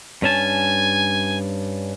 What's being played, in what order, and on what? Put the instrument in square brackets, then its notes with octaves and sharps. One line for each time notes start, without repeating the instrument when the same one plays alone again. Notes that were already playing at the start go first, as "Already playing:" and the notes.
[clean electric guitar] G2 C#4 A5 [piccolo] G#5